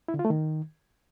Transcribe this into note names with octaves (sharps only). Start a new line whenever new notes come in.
E4
D3
F4
A3
D#3